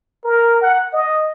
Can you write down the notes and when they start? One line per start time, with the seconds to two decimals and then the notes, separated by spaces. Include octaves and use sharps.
0.24 A#4
0.62 F#5
0.93 D#5